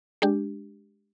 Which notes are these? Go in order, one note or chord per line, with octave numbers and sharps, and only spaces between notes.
G#3 D4 G4